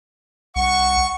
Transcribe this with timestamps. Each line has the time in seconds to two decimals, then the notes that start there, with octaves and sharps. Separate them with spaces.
0.56 C2 F#5 C#6